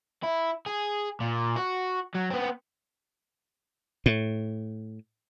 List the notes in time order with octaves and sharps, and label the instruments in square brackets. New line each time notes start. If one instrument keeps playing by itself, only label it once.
[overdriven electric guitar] E4
G#4
A#2
F#4
F#3
B3 C4
[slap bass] A2